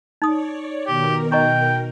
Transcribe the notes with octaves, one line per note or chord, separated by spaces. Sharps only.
D#4 C#5 D5 D#6
B2 D#3 G4 A#4
D#5 G5 A#5 C#6